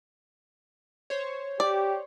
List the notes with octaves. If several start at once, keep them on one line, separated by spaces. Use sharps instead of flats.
C5 C#5
G4 D5